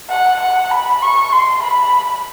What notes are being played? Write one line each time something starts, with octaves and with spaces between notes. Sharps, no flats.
F#5
F#5
B5
C#6
C6
B5